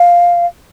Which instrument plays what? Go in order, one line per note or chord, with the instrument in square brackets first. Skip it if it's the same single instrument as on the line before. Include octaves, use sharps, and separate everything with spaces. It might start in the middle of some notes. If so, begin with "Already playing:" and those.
Already playing: [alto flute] F5